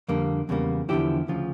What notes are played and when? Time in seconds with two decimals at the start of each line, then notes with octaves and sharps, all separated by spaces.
0.08 F2 D3 G3 A#3
0.49 E2 C#3 G3 A#3
0.89 E2 D3 F3 E4 G4
1.28 D2 C#3 F3 F4